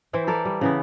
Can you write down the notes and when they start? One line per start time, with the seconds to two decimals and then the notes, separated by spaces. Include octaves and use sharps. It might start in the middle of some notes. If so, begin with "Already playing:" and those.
0.13 E3 E4 C5 G5
0.27 E4 A4 A#4 D5
0.45 G3
0.61 C#3 E3 B3